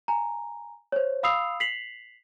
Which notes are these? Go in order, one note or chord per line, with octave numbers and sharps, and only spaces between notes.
G#5 A#5
C5 C#5
F5 B5 D#6 E6 C7 F7
B6 C7 F7 F#7